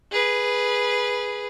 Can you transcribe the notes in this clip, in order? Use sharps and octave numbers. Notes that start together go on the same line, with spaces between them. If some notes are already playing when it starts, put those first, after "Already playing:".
G#4 B4